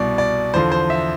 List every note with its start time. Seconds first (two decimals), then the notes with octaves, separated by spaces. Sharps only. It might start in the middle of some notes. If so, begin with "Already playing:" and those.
Already playing: C2 B2 D5
0.18 D5
0.54 E2 D3 F3 C5
0.72 C5
0.90 E5